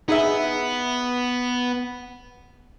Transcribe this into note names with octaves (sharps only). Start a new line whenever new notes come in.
B3 D#4 G#4 E5